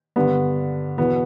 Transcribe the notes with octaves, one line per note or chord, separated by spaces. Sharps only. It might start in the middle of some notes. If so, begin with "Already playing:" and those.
G2 D3 B3
E2 B2 B3